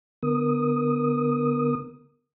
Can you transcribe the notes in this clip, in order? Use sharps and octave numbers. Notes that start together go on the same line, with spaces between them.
D3 B3 A#4 D#6